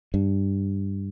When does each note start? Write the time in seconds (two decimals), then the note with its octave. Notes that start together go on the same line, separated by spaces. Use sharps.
0.14 G2